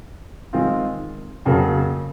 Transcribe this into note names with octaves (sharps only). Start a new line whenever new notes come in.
D#3 G#3 C4 F4
F2 C#3 F#3 A#3